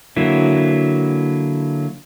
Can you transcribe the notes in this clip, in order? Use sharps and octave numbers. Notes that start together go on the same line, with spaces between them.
D3 F#3 A#3 E4